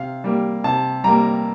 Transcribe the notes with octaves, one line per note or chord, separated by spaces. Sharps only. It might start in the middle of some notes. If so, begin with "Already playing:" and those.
Already playing: C3 F5
G3 A#3
C3 A5
G3 A#3 A#5